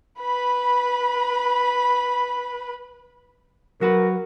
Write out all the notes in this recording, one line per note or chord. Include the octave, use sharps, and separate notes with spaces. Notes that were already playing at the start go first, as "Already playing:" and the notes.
B4 B5
F#3 F#4 A#4 B4